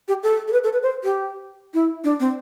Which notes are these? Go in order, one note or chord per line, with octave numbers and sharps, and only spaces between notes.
G4
A4
A4
B4
A4
B4
C5
G4
E4
D4
C4